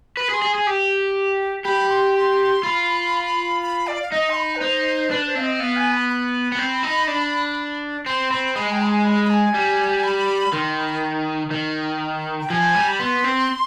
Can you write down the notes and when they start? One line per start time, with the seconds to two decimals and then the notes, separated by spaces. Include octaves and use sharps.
0.17 B4 B5
0.29 G#4
0.33 C6
0.42 G#4
0.54 G#4
0.67 G4
1.65 G4 B5
1.90 C6
2.15 C6
2.63 F4 B5
3.63 B5
3.87 D5
4.02 F5
4.12 D#4 D#5
4.30 C6
4.36 B5
4.56 B4
4.61 D#4 C5
5.10 D4 B4
5.27 C5
5.35 C4 F5
5.43 D#5
5.59 B3 F5
5.77 G#5
5.92 B5
6.09 B5
6.52 B3
6.58 C4
6.83 D#4
7.07 D4
8.06 C4 C6
8.31 C4 B5
8.56 G#3 B5
8.72 G5
8.82 B5
8.89 G#5
9.05 B5
9.25 B5
9.30 G#5
9.54 G3
10.04 B5
10.53 D#3 C6
10.78 B5
11.51 D#3
12.41 G5
12.50 F3 G#5
12.75 G3
12.88 B5
12.99 B3 C6
13.24 C4